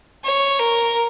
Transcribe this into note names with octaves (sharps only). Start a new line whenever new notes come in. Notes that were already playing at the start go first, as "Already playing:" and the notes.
C#5
A#4